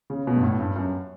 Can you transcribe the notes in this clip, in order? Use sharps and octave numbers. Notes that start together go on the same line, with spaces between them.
C#3
B2
G2
A2
G2
F#2